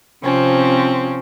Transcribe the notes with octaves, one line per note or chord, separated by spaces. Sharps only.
C3 F3 C4 C#4